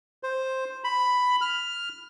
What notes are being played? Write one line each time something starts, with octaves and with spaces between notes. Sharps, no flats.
C5
B5
F6